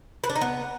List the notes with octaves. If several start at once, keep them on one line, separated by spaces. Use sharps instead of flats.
B4
D4
D#4
B3